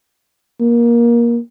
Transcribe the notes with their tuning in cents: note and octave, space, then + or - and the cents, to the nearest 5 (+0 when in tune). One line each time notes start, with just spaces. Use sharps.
A#3 +20